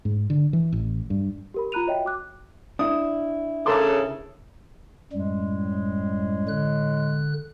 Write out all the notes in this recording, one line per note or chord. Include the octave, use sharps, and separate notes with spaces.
G#2
D3
E3
A1
G2
G4 A#4 B5
F4 A#5 B5 F#6 D#7 F7
F#4 C#5 D#5 E5 G5
F#4 D6 F#6
D4 E4 D#6
C#3 A4 A#4 C6 D6
F#2 A2 G3 G#3
D3 F#6